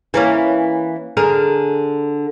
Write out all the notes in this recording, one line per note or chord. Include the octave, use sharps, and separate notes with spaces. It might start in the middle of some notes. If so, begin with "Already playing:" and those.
E3 A#3 C#4
D3 G#4 A#4